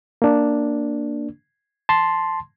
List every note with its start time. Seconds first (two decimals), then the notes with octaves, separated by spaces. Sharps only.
0.22 A#3 D4
1.89 A5 C6